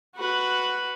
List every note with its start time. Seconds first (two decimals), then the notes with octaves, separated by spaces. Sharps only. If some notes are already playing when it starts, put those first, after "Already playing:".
0.16 F#4 B4